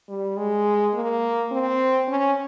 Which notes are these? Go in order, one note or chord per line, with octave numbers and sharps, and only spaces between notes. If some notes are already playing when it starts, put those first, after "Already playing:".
G3
G#3
A#3
C4
C#4